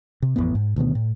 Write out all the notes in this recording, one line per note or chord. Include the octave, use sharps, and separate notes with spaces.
C3
A1 F2 A2 B3
G#2
D2 B2 D#3 B3
A2